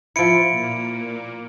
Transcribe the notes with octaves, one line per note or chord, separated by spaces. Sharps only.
F3 E4 C#7 D7
A#2 A#3